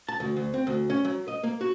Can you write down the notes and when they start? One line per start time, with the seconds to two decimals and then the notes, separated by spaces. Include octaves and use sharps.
0.08 A5
0.20 D2
0.37 D2
0.54 C4
0.67 D2
0.90 C#4
1.05 F#3
1.28 D#5
1.43 A#3
1.61 F#4